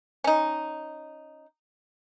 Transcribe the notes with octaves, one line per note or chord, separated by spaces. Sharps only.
C#4 D#4